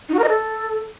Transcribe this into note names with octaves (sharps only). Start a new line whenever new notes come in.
D#4
F#4
A#4
D#5
A4